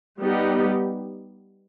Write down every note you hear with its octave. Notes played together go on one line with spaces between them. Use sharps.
G3 B3 D#4 G4